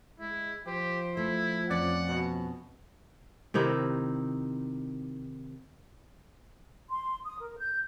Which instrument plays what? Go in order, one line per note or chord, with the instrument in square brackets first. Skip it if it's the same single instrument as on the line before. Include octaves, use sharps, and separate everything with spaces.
[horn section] G#3 [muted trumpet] E4
[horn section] F3 [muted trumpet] G4 [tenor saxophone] C5
[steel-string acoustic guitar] A3 [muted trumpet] E4
[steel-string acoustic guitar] F2 C#4 [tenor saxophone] D5 [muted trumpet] F#5
[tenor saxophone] B2
[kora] C3 D#3 D#4 E4
[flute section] C6
D#6
A#4
G6